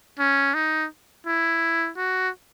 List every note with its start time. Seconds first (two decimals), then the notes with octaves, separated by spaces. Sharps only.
0.19 C#4
0.54 D#4
1.26 E4
1.97 F#4